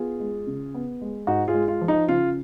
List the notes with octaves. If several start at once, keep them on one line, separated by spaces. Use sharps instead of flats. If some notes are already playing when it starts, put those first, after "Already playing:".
Already playing: B3 F4 G#4
G#3
C#3
B3
G#3
G#2 D#4 F#4
F4 G#4
G#3
F4
F3
D#4
C#3 F4